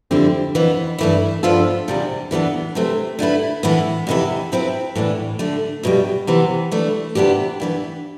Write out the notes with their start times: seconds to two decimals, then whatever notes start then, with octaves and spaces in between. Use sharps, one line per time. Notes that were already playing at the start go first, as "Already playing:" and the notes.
0.11 F2 D3 G3 C4 E4
0.55 F2 E3 B3
0.98 G2 E3 A3 E4
1.43 G2 F3 B3 F4 A4
1.88 E2 C3 G3 D4
2.31 A2 E3 G3 B3 D4
2.75 C3 E3 A3 C4
3.19 D3 A3 E4 B4
3.63 A2 E3 B3 E4
4.07 F2 C3 E3 B3 E4
4.52 C3 F3 C4 E4 B4
4.95 A2 E3 B3 D4
5.39 D3 A3 D4
5.83 E2 B2 G3
6.27 C3 E3 B3
6.72 E3 A3 D4
7.15 C3 E3 B3 D4 G4
7.60 G2 E3 B3